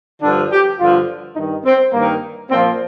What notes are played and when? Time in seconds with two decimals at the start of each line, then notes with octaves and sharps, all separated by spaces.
0.22 G2 D3 F3 D4
0.51 G4
0.80 G2 D3 F3 F4
1.36 G2 D#3 D#4
1.65 C4
1.93 G2 D#3 A#3
2.50 A#2 C4
2.54 F3